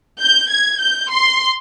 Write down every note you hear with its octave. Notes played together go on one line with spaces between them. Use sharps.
G6
G#6
G6
C6